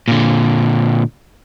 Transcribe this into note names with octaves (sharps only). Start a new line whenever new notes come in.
A#2 D3